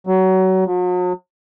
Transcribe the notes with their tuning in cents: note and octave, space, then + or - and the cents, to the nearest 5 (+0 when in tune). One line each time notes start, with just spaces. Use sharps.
F#3 +25
F#3 -45